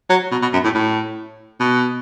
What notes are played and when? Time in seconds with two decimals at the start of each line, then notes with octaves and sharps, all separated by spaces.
0.10 F#3
0.31 B2
0.42 B2
0.53 F#2
0.64 A2
0.74 A2
1.60 B2